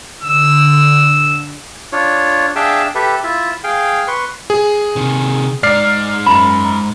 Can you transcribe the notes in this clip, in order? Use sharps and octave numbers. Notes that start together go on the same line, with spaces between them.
D3 E6
D4 F4 C#5
D4 G#4 E5 F5 G5 A5
G4 A4 B4 E5
E4 F4 E5
G#4 F5 G5
B4 C6 C#6
G#4
C3 D#3
G#2 D#4 D5 F6 C7
F#2 B5